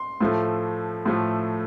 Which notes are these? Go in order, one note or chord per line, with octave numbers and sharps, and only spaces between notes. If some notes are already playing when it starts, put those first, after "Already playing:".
Already playing: C6
A2 F3 A3
A2 F3 A3